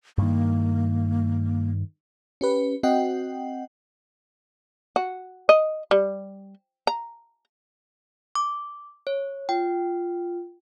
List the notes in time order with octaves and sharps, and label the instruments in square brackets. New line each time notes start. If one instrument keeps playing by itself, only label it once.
[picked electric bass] G2 D#3 [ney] A#3
[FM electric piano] C#4 G4 B4
C4 F#4 D#5 F#5 G5
[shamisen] F#4
D#5
G3
A#5
[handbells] D6
C#5
[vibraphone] F4 [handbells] G5